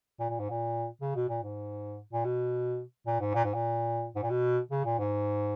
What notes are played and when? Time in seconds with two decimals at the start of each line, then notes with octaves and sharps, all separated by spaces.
0.20 A#2
0.30 A#2
0.40 G#2
0.50 A#2
1.01 C#3
1.15 B2
1.29 A#2
1.43 G#2
2.13 A#2
2.24 B2
3.06 A#2
3.20 G#2
3.34 A#2
3.44 G#2
3.54 A#2
4.15 G#2
4.22 A#2
4.30 B2
4.71 C#3
4.85 A#2
4.99 G#2